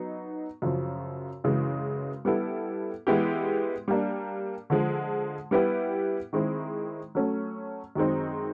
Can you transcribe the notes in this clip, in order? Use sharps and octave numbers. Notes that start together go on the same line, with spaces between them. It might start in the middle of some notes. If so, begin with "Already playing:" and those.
Already playing: F#3 B3 D#4
F#2 C#3 F3
F#2 C#3 E3 G#3
G3 B3 E4 A4
E3 G#3 B3 E4 G4
G3 A#3 D4
D3 F3 G#3
G3 B3 E4 G4 B4
D#3 G#3 C4 E4
F#3 A3 C#4
F#2 D#3 G#3 C4 D#4